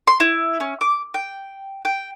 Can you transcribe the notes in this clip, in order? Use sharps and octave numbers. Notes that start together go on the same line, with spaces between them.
C6
E4
C#4
D6
G5
G5